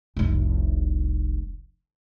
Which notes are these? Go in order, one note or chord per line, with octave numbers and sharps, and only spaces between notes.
F1 C2